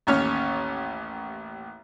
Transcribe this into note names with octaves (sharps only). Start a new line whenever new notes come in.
A1 D#2 C#4 C#5 F6